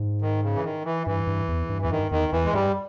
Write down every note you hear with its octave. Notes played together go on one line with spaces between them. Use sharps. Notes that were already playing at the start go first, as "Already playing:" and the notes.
Already playing: G#2
D#3
C#3
E3
D#3
E3
G2 E3
G2
E2
G2
E2 E3
G2 D#3
E2 D#3
E2 E3
G#3
G2 G3